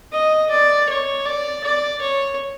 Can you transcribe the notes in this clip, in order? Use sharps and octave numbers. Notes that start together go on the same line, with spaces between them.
D#5
D5
C#5
D5
D5
C#5